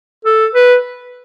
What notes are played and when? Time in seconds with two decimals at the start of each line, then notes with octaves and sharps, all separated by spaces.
0.25 A4
0.54 B4